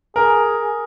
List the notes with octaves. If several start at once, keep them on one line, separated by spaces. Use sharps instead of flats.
G#4 A#4